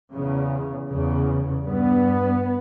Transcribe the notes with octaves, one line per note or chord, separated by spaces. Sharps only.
E2 C#3
E2 C#3
G2 B3